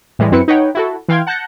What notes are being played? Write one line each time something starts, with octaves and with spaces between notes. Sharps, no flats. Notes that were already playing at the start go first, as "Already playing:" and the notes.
A2 E3 G3 G#3
F#2 C4 E4 B4 C#7
D#4 B4 C#5 F#5 G5
E4 F#4 A4
E3 F5 G5 C6 G#6
F#5 A5 F#6 G6 A#6 C#7